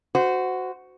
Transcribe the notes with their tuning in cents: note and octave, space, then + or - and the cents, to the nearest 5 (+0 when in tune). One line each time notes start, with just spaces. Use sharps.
F#4 +0 C5 -25